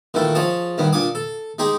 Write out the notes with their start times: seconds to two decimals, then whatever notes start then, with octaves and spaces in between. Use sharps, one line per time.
0.14 A#2 D#3 E3 A3 A4
0.35 F3 G#4 C#5 D#5 A5
0.78 G2 D#3 B3
0.92 A#2 D4 G#5 D6 D#6
1.15 A4
1.59 G#3 D#4 G4 G#4